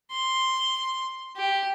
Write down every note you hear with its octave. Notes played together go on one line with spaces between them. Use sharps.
C6
G4